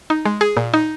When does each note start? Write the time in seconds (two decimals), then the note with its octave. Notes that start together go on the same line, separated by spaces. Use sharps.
0.10 D#4
0.25 G#3
0.41 G#4
0.57 A#2
0.74 D#4